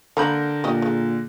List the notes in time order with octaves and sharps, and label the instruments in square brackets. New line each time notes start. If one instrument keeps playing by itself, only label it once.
[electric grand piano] D3 A#4 G6 [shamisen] A#3 A#5 B5
[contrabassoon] A#2 [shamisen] G4 D#5
[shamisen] G#3